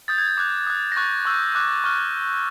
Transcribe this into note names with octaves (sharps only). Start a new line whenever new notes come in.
D#6 G6 A6
G#6
G6
D6 F#6 G#6
D#6 F#6
A#6
C#6 F#6 A6
C#6 E6 G6
D6 F#6
C#6 F6